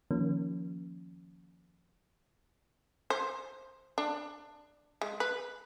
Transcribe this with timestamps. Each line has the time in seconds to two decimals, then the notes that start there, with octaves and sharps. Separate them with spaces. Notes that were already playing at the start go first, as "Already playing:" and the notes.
0.11 D#3 F3 A#3 C#4
3.10 C5
3.98 D4
5.02 G#3
5.20 B4